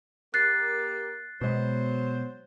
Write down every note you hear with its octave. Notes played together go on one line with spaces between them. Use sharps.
A#3 G4 F#6 A6 C7
B2 F#3 G#3 B3 C5